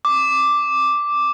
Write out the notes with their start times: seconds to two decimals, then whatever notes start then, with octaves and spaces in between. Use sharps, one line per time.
0.05 D6